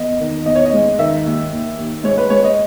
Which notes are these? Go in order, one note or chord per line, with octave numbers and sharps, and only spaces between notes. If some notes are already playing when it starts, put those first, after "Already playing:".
Already playing: E2 D#5
D#3
E2 D#5
C#5
D#5
G#3
D#3 E5
D#2
D#2
D#2
G#3 C#5
B4
G#3 C#5
D#5